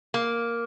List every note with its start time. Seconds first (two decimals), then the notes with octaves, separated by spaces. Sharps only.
0.14 A#3